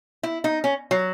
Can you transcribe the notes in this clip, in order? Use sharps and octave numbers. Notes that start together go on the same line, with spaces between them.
E4
D#4
C#4
F#3